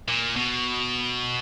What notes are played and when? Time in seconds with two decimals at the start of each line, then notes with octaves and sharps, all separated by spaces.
0.08 A#2
0.36 B2